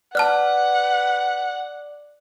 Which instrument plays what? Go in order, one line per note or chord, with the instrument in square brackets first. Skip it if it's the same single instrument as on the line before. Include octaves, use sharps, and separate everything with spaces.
[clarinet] B4 [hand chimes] D5 [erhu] F#5 [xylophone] A5 F6 F#6